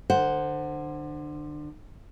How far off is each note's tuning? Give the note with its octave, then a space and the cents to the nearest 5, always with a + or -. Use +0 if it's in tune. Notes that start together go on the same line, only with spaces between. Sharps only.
D3 +30 C5 +0 F#5 +0